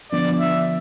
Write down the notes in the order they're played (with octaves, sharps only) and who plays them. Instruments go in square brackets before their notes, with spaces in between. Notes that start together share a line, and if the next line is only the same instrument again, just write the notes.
[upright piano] D3 F3 B3 [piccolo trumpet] D5
[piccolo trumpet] E5